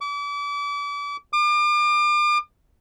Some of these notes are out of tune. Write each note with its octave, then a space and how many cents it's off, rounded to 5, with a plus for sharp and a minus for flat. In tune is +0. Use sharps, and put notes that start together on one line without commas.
D6 -35
D6 +40